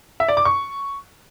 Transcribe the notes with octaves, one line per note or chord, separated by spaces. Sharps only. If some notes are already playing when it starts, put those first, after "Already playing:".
E5
D5
D6
C#6